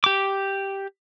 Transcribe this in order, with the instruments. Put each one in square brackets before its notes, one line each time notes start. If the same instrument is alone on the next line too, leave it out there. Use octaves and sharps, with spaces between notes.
[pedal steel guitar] G4 D6